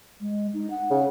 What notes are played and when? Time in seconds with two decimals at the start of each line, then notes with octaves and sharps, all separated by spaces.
0.21 G#3
0.54 D#4
0.70 F#5
0.91 C#3